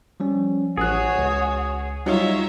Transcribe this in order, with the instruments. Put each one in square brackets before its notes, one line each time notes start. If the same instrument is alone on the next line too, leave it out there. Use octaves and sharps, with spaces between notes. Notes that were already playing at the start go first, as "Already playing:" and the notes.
[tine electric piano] F3 G3 C#4
[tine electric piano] A1 F#6 [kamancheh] F#4 C#5 [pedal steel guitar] G#4
[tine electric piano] C#2
[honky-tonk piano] F#3 D#4 F4 [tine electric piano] G3 [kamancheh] C#5 E5